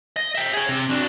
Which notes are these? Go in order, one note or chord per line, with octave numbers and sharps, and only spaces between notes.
D#5
E5 G5
G#4 C#5
C3
F#3 D4